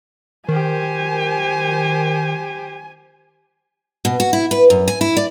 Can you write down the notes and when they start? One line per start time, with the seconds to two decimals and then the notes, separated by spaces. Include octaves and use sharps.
0.48 D#3 G4 C5 G#5
4.05 B2
4.20 F#4
4.33 E4
4.51 B4
4.70 F#2
4.88 G#5
5.01 E4
5.17 D5